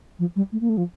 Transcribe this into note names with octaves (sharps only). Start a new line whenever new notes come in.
F3
G3
A3
A#3
A3
F3